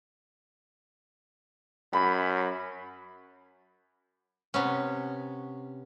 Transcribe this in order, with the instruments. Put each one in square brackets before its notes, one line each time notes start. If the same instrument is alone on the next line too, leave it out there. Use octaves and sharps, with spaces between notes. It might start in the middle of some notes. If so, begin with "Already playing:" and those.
[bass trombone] F#2 [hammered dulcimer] B5
[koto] C3 B3 C#4